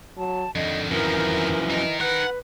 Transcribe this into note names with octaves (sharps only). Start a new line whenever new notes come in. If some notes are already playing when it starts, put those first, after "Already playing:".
F#3 A5
F2 D3 D#3 D#5
F#2 E3 F3 A#4
D#4 A#4 D#5
B4 F#5